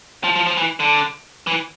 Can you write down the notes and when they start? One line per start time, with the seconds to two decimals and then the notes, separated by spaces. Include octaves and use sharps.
0.24 F3
0.36 F3
0.46 F3
0.57 E3
0.80 D3
1.47 E3